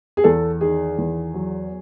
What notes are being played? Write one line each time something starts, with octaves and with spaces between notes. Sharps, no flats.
G#4
E2 A4
D#3 G#4
E2
F#3